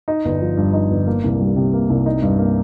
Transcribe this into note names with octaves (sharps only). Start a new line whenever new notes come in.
D#4
G1
F3
G2
D#4
G1
A#3
C2
G3
C3
A#3
C2
D#4
G2
A#3